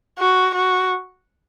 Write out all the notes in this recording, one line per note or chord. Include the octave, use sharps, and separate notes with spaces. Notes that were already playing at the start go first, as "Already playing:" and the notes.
F#4
F#4